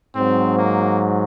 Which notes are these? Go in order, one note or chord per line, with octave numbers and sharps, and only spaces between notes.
G#2 F#3 C4
A#3